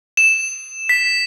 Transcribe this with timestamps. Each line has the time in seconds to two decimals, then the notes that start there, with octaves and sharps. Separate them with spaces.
0.17 E7
0.89 B6